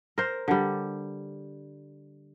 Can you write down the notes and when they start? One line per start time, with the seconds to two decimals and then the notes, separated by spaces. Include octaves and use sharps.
0.18 A#4 C5
0.48 D3 G3